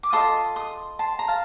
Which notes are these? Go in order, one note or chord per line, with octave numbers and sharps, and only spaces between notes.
D6
F4 A4 D#5 C6 D#6
C6 D#6
A5 C6
A#5
F5 A5